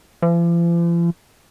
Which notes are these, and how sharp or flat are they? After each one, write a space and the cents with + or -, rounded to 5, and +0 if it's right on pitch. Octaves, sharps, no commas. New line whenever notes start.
F3 -45